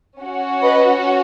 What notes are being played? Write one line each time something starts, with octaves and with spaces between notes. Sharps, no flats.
C#4 F#4
B4 D#5